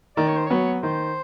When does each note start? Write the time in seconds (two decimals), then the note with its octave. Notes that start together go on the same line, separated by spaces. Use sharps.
0.17 D#3 D5
0.27 C#5
0.37 C5
0.46 F#3 B3 C#5
0.82 D#3 C5